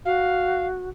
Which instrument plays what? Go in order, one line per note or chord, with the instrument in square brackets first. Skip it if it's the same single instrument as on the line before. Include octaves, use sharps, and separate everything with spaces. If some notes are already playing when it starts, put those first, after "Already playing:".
[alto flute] F#4 [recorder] F5